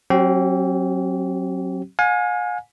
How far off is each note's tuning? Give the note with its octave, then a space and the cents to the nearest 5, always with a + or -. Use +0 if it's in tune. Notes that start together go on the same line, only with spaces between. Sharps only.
F#3 +0 C4 +45 G4 -40
F5 +45 G#5 +0